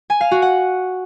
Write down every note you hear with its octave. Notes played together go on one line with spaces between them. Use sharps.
G#5
F5
F#4
F#5